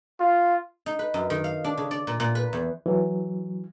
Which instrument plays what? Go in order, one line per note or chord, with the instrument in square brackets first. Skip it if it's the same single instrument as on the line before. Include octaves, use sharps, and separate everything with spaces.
[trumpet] F4
[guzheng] D#4
B4
F#2
D#3
F5
D4
C#3
D5
A#2
A#2
B4
E2
[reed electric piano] E3 F#3